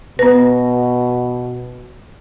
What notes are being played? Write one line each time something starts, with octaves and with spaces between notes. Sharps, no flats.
B2 B3 B4